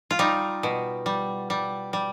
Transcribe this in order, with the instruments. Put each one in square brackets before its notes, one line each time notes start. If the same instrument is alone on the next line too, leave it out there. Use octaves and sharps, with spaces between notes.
[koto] F4
G3 D#4
B2
G3
G3
G3